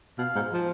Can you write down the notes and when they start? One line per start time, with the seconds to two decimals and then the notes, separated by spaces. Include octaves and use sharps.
0.18 B2 F5
0.35 G#2
0.53 F3